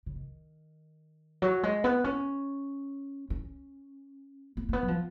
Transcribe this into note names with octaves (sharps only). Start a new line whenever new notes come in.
C#3
D#3
F#3
G#3
B3
C#4
C#4
B3
A#3
B3
F#3
F3